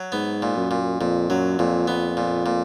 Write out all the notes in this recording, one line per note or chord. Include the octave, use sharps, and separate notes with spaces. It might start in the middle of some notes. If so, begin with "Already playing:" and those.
Already playing: F#3
G#2 B3
A#2
F#2
A#2
F2 A#2
F#2 F#3
F2 A#2
F2 B3
A#2
A#2